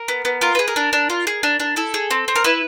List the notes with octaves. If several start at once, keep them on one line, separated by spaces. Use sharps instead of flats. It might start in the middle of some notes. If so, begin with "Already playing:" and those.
Already playing: A#4
B3
B3
F4 A#4
G#4 B4
A#4
D4
D4
F4
G#4
D4
D4
E4 A4
G#4
C4
C4
A#4
E4 B4